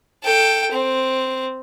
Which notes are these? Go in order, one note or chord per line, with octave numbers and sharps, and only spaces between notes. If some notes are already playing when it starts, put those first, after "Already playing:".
A4 G5
C4